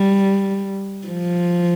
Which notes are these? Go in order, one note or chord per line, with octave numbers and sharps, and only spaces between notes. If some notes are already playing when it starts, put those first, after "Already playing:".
Already playing: G3
F3